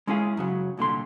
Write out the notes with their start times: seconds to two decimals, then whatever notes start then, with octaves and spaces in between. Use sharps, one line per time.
0.07 G#3 C#4 E4 G#4 F5
0.37 F#2 C#3 F#3
0.77 C2 A#2 D3 C6